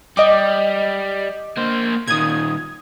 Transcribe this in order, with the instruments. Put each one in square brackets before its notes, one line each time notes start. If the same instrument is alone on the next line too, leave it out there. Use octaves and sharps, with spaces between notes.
[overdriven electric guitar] G3 [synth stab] D#5 D6
[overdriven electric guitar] A#3 C5
[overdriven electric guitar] A#2 D#3 [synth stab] D#6 G#6